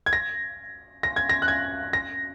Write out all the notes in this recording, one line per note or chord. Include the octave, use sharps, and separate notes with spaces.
G#6
A#6
A#6
G#6
A#6
F#6
G#6
A#6